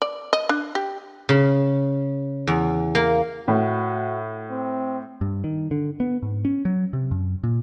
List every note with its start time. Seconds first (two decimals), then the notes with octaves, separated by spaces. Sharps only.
0.02 D5
0.33 D#5
0.49 D4
0.75 G4
1.29 C#3
2.47 E2
2.95 A#3
3.48 A2 F#4
4.50 C4
5.21 G2
5.44 D#3
5.71 D3
6.00 B3
6.23 G#2
6.45 C#4
6.65 F#3
6.93 C3
7.11 F#2
7.44 A#2